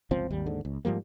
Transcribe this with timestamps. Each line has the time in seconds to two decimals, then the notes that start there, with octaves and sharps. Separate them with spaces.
0.11 G1 C#2 F3 C4
0.30 G#1 D#2 G3
0.46 D#2 G#2 D3
0.65 C#2
0.85 G#2 F3 G3 A#3